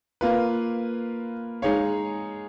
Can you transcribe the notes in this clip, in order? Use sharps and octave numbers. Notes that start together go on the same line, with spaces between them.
A#3 F4 B4
G#3 D#4 G#4 C#5 F5